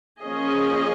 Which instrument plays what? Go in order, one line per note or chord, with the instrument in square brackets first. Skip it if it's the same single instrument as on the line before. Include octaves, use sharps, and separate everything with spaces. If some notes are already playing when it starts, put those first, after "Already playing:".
[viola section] F3 A#3 C#4 G#4 D#5